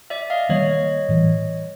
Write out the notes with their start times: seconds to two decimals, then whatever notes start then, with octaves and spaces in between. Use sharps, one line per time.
0.10 D5 E5
0.30 D#5 F5
0.49 D#3 G3 A#3 C#5 D#5
1.09 A2 E3 G3